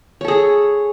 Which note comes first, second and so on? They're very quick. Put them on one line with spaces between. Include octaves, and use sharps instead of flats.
C#5 A4 G#4